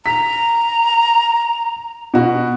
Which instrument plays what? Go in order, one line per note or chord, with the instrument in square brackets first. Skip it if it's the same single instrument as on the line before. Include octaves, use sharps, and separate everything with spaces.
[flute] A#5 [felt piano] B6
[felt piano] B2 F#4